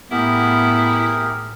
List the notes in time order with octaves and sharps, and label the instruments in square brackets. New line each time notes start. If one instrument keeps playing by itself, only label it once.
[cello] A2 [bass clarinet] B3 [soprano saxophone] E4 [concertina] G4 G#4 A#4